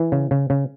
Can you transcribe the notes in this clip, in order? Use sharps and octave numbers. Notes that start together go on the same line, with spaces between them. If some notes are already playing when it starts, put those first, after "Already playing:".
Already playing: E3
C#3
C#3
C#3